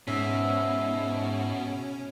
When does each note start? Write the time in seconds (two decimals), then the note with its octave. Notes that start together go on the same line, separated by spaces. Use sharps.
0.08 G#2 B2 C#4 E5